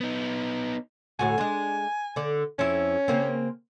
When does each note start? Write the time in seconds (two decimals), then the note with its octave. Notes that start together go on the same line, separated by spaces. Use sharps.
0.01 B3 D#4
1.19 D2 A2 F#4 G#5
1.38 G#3 D4
2.16 D3 D5
2.59 F2 C#4 E4
3.08 C#3 A#3 C4